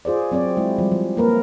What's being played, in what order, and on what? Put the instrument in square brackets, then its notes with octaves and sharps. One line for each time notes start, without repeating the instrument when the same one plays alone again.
[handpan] F4 G#4 C5 D5
F#3 C4 C#5 D5
G#3 E4
F3 G3
F3
A#3 A#4 B4